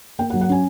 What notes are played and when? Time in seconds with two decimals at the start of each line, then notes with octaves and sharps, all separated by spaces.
0.19 A#3 G5
0.30 F#5
0.34 F#3
0.41 F#5
0.49 C#4 G#5